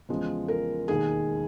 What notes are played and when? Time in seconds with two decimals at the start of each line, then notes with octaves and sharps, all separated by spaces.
0.09 E2 C#3 F3 G#3
0.48 A#4
0.88 E1 D#2 D#3 G#4